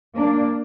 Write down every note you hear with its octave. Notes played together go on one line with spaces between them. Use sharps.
A#3 D4